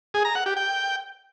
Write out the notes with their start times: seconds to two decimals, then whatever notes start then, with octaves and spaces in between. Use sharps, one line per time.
0.14 G#4
0.25 A#5
0.35 F#5
0.46 G4
0.57 G5